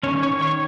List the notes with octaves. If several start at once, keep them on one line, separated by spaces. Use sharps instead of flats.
D#3 C#4 C#5
C#5 C#6
D#3
C#5 C#6